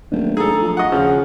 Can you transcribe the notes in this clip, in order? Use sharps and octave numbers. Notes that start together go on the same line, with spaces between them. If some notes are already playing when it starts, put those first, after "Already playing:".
D#1 F#3 A3 D4
G#2 G#4 A4 A#5
F3
F#4 D#5 F#5
D#2 C#3 F3 F6